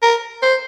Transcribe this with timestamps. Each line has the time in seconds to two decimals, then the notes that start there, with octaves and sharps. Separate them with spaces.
0.02 A#4
0.42 C5